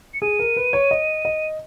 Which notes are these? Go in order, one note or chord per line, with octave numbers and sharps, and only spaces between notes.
C#7
G#4 D#7
A#4
B4
C#5
D#5
D#5